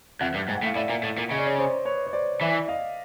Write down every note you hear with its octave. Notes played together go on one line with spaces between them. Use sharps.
F2 E5 F#5
G2
G#2 G5
F#5
A2
F5
A2 D5 E5
A#2
A2
A#2
C#3 D#5
D5
C#5 D#5
C5 D5
B4 C#5
C#5
C5 D5
E3 D5 E5
D#5 F5